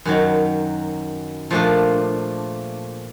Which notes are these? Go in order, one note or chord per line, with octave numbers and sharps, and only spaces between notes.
F#2 D#3 F#3
A#2 F3 A3 D4